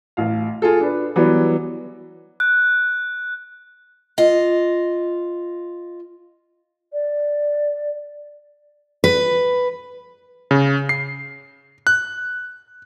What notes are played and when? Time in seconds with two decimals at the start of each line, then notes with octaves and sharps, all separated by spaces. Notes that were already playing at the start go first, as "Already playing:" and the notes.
0.17 A1 F5
0.62 F4 G#4 A4
0.80 D4 B4
1.16 E3 F#3 G3 B3 B4 D5
2.40 F#6
4.18 F4 D#5
6.93 D5
9.04 B4
10.51 C#3
10.89 C7
11.87 F#6